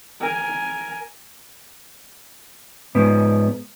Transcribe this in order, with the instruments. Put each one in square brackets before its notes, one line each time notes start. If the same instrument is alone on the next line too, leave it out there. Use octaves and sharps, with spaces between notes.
[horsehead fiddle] A#4 G#5
[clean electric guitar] G#2 B3